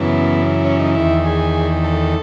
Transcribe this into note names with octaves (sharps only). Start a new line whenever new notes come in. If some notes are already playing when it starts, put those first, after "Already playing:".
Already playing: F#2 C#3 E3 B3
C#4
D#4
E2 D#3 E4
G#4
A4